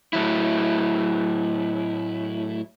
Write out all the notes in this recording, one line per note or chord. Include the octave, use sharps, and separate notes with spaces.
A2 F#3 E4